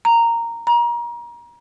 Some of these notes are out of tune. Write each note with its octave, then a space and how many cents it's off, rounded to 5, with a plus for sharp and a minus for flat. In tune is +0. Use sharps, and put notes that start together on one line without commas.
A#5 -10
A#5 +30